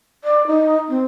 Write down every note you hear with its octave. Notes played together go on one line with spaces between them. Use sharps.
D5
D#4
C4